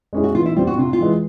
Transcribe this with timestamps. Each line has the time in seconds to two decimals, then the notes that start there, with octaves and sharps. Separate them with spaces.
0.13 G#3 C#4 E4 G#4
0.24 F#4
0.35 E3 F4
0.46 E4
0.56 G3 C4 F4
0.67 F#4
0.78 C3 F4
0.93 F4
1.00 E3 G#3